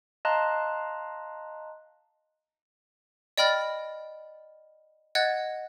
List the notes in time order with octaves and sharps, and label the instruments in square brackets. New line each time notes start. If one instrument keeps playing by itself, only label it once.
[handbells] D#5 F5 A5 A#5 C6 F#6
[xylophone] D5 D#5 G5 B5 F6 A6
D#5 F#5 F#6 G#6 A6